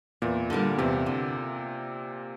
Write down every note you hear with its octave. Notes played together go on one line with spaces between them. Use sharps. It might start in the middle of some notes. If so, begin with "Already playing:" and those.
E2 A#2
D3 G3 A#3
E2 C3
D3